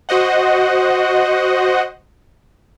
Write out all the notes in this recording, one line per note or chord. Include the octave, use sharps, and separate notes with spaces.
F#4 C5 D#5 F#5